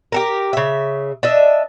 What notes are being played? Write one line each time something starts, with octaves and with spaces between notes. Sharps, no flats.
G4 A4 A#4
C#3 E5
D4 D#5 E5